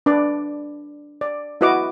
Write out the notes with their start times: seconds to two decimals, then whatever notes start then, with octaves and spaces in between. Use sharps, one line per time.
0.06 D4 B4 D5
1.21 D5
1.61 E4 F#4 B4 D#5 F#5 D6